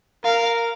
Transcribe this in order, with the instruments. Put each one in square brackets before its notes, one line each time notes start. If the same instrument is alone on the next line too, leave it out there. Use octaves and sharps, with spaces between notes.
[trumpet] A#4 [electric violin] F5